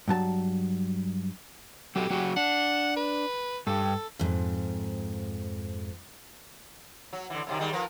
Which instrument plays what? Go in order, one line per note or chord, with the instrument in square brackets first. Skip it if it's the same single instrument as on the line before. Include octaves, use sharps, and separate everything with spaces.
[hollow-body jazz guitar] G2 F#3 A5
[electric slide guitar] F#3 F#4 A4 [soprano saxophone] G4
[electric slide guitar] F#3 F#4 G#4
[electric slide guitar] D4 [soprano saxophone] F#5
[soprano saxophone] B4
[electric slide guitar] G2 G4 [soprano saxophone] A4
[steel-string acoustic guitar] F2 G#2
[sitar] F#3
D3 E3
F#2 C3 D#3
D#3 G3 G#3
F3 A#4 B4